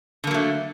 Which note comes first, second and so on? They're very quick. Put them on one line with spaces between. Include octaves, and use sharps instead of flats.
D3 A#3 F#3 A3